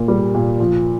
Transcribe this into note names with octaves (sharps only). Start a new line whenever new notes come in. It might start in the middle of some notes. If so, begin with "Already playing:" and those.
Already playing: A#2 A#3
G3
A#2
F3